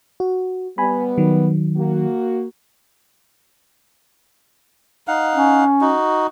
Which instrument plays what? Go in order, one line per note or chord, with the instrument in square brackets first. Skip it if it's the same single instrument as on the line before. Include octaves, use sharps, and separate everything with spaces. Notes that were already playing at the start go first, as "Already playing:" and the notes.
[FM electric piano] F#4
[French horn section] G3 B3 [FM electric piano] G#5 B5
[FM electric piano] D#3 F#3
[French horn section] A#3 F#4
[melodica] D#4 F5 F#5
[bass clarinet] C#4
[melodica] D#4 F#4